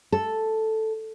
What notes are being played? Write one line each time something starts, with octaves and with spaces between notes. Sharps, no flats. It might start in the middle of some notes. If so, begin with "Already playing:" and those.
A4